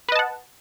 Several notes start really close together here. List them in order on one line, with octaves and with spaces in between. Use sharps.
B4 D#5 A5 F#5